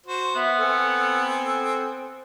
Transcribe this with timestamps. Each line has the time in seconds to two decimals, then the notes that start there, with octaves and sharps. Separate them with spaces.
0.06 F#4 C5
0.35 B3 E5
0.58 C4 A4 G#5